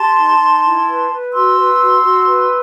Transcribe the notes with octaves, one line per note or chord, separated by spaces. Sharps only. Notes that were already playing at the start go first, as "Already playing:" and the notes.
Already playing: G4 A5 C6
D#4
D#4
E4
B4
B4
F#4 C6 E6
B4
F#4
F#4
B4